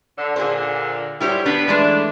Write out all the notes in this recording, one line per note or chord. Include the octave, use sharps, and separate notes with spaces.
D3
A#2 D3 G#4 C5
F#3 G3 E4 G4 C5
B3 D4 B4
E3 G#3 A3 D4